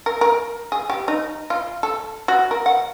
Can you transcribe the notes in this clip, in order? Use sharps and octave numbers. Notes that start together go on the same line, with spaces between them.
A#4
A#4
G#4
G4
D#4
F4
A4
F#4
A#4
F#5